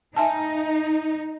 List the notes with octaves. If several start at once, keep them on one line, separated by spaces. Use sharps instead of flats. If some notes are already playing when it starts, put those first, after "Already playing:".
D#4 E5 G#5 A5